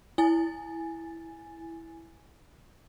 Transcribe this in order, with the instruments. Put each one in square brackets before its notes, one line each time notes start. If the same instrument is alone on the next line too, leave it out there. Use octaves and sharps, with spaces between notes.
[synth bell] E4 G#5 A6